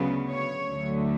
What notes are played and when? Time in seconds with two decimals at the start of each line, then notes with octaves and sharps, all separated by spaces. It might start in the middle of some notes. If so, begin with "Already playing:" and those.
Already playing: D2 C#3 F#3 B3
0.32 C#5
0.67 D2 D3 F#3 A3